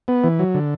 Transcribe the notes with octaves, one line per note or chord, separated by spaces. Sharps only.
B3
E3
F#3
D3